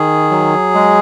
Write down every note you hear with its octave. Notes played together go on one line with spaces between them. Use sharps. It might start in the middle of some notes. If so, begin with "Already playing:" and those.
Already playing: D#3 G#4
F#3
G#3